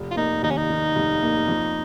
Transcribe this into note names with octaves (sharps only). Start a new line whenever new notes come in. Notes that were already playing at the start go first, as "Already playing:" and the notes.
Already playing: F1
F4
A#3 D#4
D#2 D#4
C#4
D#4
D#3
F1
A#3
F2